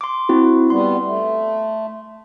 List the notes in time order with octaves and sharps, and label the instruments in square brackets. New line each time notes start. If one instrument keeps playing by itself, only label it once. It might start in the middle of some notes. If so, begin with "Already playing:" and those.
[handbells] C6 D6
C4 E4 F#4
[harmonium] G3 B3 [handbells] C6
[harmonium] A3